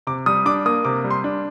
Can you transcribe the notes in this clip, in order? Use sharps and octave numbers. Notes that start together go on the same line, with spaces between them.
C3 D6
G3 D#6
D4 D6
A#3 D#6
C3 D6
G3
C6
D4